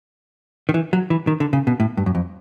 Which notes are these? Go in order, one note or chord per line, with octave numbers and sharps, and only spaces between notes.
D#3
E3
F#3
E3
D#3
D3
C#3
B2
A2
G2
F#2
F2